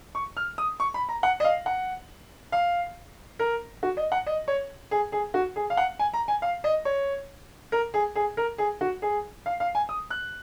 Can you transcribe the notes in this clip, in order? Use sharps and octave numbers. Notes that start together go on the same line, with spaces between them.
C#6
F6
D#6
C#6
B5
A#5
F#5
D#5
F5
F#5
F5
A#4
F#4
D#5
F#5
D#5
C#5
G#4
G#4
F#4
G#4
F5
F#5
G#5
A#5
G#5
F5
D#5
C#5
A#4
G#4
G#4
A#4
G#4
F#4
G#4
F5
F5
G#5
D#6
F#6